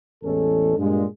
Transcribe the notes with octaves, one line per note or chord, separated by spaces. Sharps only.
A1 E2 G#3 C#4 A4
G2 A#2 G#3